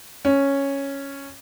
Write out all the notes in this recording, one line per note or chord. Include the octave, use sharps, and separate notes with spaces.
C#4